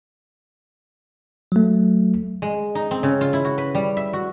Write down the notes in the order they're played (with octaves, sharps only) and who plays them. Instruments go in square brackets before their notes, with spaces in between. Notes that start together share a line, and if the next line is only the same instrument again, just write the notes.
[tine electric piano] F#3 A3
[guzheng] G#3
D#4
C4
C#3
F4
E4
F#4
B4
G3
E5
F#4